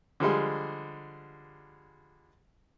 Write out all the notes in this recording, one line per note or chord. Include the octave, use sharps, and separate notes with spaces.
D3 F3 G3 G#3